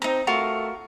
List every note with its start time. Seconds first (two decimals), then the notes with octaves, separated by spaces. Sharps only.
0.02 C4 D#4 A#5
0.27 A3 F4 F#4 A#4